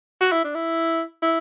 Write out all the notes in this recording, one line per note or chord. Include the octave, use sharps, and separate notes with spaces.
F#4
E4
D4
E4
E4